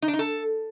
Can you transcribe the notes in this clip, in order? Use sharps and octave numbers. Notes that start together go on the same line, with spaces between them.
D#4
D4
D#4
A4